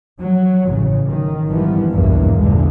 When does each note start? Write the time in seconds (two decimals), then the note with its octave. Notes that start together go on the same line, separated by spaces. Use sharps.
0.18 F#3
0.68 A1 C#3
1.07 D#3
1.49 G#1 G2 E3 F3 G3 B3
1.91 B1 E2 G2 B2 E3 A#3
2.35 A#1 E2 G2 A#2 D3 G#3